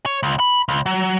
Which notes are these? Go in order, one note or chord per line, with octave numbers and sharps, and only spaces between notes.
C#5
C#2
B5
C#2
F#3